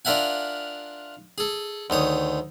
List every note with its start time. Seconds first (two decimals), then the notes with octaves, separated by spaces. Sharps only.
0.05 D4 F4 A#4 E5 F#5 G#5
1.38 G#4 A4
1.90 D2 D#3 C#5 D#6